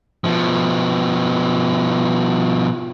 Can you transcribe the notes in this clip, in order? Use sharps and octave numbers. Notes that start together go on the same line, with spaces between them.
B2 F3